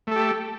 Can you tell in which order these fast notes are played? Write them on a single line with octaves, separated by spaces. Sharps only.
A3 A4 G4